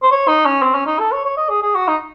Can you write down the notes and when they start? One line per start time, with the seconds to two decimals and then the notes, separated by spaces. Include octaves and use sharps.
0.03 C5
0.11 C#5
0.28 D#4
0.45 C#4
0.62 C4
0.75 C#4
0.87 D#4
0.99 A4
1.12 C#5
1.25 C#5
1.37 D#5
1.49 G#4
1.62 G#4
1.75 F#4
1.88 D#4